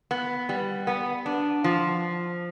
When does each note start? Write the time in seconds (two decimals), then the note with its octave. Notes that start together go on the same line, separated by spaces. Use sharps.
0.11 B3
0.49 G3
0.87 B3
1.26 D4
1.64 F3